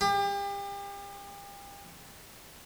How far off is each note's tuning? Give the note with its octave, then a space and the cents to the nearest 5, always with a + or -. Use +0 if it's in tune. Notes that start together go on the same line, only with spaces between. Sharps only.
G4 +35